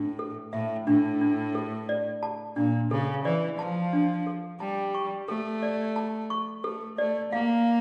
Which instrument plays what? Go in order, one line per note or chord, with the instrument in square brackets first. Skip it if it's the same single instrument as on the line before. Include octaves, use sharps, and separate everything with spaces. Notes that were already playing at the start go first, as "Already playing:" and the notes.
Already playing: [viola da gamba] A2 [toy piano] D4
[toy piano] A4
[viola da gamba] A2 [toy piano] E5
[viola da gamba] A2 [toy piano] D4
[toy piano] D4
A4
D5
A5
[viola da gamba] A#2 [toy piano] D4
[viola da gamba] C#3 [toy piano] A4
[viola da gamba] E3 [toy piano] D5
[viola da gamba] F3 [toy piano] A5
[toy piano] D4
A4
[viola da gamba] G3 [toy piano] A5
[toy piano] C#6
[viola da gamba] A3 [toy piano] A4
[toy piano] D5
A5
C#6
[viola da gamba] A3 [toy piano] A4
[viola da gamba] A3 [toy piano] D5
[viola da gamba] A#3 [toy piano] F5